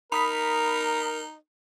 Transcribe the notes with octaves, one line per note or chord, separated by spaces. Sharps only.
D#4 A#4 B5 D#6 B6